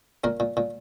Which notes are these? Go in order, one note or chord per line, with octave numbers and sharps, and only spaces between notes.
A#2 A#3 A#4
A#2
A#2